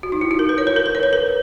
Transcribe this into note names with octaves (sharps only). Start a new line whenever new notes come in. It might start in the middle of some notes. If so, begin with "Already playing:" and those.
F#4
D#4
E4
F#4
A#4
B4
C#5
B4
A#4
B4
C#5
B4
A#4